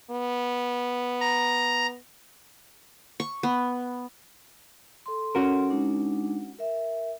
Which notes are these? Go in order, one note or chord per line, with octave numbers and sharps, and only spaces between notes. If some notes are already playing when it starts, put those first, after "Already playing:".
B3
A#5
C#6
B3
A4 C6
C#4 F#4 A#4
G#3 D4 D#4
A#4 E5